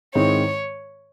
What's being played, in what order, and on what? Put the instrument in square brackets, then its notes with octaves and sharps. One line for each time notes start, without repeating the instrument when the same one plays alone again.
[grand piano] G#2 D#3 G#3 C4 E4 [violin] C#5